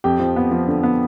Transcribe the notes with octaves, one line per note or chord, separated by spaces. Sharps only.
F2 G4 G5
F3
B3
F3
D3
B3